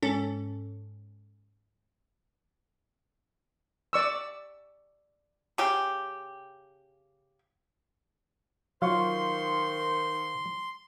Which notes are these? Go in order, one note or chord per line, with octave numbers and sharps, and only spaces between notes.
G#2 C#4 A4
D5 C#6 E6
C#3 G4
D#3 F#3 F4 C5 F5 C6 C#6